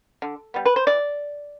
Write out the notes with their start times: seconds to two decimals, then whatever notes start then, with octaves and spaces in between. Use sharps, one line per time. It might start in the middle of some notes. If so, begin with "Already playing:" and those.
0.22 D3
0.54 G3 B3
0.66 B4
0.76 C5
0.87 E3 D5